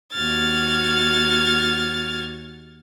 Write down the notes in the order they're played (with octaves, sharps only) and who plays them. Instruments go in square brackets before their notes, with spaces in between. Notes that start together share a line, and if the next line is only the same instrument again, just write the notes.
[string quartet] D#2 F#4 F6 G#6 A6